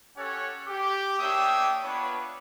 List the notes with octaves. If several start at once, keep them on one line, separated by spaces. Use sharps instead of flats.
C#4 G4 A4 C#5 F#5
G4
A#3 D4 C#5 E5 G5 D#6
B3 D4 F4 B4 C#5